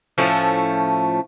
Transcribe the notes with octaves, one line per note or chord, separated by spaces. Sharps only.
A2 F3 A3 C#4